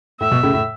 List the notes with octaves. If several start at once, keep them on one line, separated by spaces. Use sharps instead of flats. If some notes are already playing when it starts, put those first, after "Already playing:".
A2 E5
B2
A2 C#3
A2